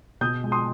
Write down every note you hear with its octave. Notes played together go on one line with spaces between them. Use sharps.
B2 D#6 G6
G#3
C6 D#6